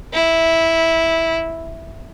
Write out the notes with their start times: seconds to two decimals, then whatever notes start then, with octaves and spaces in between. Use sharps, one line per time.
0.14 E4